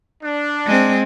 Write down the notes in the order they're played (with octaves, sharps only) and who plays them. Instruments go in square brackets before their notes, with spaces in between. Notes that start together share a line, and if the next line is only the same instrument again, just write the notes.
[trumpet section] D4
[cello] G#3 C4